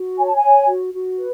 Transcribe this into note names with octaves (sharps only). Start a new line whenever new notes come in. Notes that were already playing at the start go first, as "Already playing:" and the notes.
Already playing: F#4
C#5 G#5
A5
G#5
C#5
F#4
F#4
B4